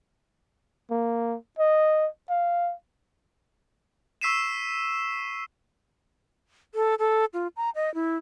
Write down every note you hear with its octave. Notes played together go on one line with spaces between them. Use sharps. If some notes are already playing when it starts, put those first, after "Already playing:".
A#3
D#5
F5
C#6 E6 B6 C7 D#7 E7
A4
A4
F4
A#5
D#5
E4